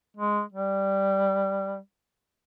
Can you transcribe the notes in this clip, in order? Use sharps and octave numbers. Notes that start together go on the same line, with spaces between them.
G#3
G3